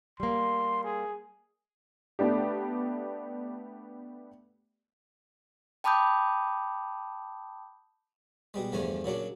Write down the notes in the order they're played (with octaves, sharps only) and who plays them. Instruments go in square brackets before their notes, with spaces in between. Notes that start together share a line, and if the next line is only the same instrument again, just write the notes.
[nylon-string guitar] G3 A#3 [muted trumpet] C6
[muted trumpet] G#4
[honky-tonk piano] A3 B3 D4 G4
[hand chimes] G5 A5 B5 D6 D#6 G6
[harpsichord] B2 G3 G#3
E2 G2 D3 F3 A3 G#5
A#2 C#3 F#3 D4